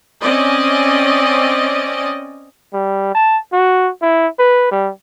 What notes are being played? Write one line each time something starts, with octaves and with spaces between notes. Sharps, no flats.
C4 C#4 D5 D#5
G3
A5
F#4
E4
B4
G3